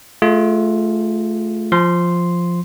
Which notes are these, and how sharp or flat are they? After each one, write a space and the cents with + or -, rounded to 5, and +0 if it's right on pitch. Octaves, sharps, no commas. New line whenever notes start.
A3 -20 F4 +0 G#4 +0
F3 +0 C6 +0